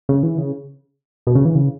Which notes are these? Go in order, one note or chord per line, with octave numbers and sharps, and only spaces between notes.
C#3
E3
C#3
B2
C#3
E3
C#3